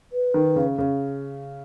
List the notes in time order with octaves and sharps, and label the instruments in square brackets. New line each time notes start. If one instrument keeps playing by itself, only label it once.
[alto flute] B4
[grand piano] D#3
C#3
C#3